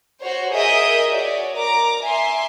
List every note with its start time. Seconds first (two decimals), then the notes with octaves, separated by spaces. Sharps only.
0.21 F#4 C5 C#5
0.51 G#4 A#4 D#5 E5 D#6 G6
1.11 F#4 C#5 D5
1.56 A#4 A#5 D6
2.02 E5 G#5 C6